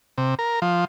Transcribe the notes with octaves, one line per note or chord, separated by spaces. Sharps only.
C3
A#4
F3